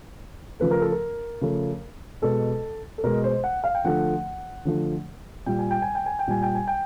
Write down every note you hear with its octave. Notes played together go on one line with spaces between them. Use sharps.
C#3 F3 A3 B4
A#4
A4
A#4
C#3 F3 A3
B2 G#3 A4
A4
B2 G#3 A#4
C5
F#5
F5
G5
D3 F3 A3 F#5
D3 F3 A3
A#2 G3 G5
G#5
G5
G#5
G5
G#5
G5
A#2 G3 G#5
G5
G#5
G5